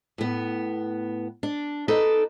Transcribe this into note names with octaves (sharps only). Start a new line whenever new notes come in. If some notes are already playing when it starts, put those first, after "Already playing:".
A2 B3
D4
D#4 A4 B4 D5